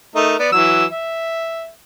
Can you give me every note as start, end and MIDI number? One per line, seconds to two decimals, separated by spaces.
0.15 0.35 57
0.15 0.35 63
0.15 0.35 70
0.39 0.50 59
0.39 0.50 74
0.52 0.85 52
0.52 0.85 54
0.52 0.85 88
0.91 1.69 76